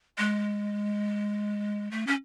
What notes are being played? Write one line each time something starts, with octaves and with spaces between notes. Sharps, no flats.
G#3
A3
C#4